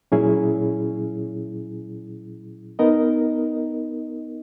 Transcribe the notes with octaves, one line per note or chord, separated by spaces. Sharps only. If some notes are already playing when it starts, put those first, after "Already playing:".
A#2 F#3 C#4 E4 G#4
B3 D#4 A#4 D#5